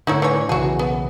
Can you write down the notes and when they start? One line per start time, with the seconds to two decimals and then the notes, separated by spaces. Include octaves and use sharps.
0.07 A2 D3 D#4 E4 C#5
0.22 E3 C#5
0.49 B1 C#3 E3 F#4 G#4
0.79 B3